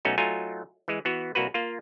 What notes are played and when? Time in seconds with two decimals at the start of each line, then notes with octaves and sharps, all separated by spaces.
0.05 B1 A3 C#4 D#4 F#4
0.18 F#3 A3 D#4 F4 G#5 A#5
0.88 E3 G#3
1.05 E3 B3 F#4
1.35 C2 A#3 F#4 B4
1.54 A#3 F4